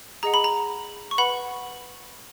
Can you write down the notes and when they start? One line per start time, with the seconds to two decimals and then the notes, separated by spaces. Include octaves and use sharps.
0.23 G#4 D#5 F#5 A#5
0.34 B5
0.44 A#5
1.11 C#6
1.18 B4 F#5 B5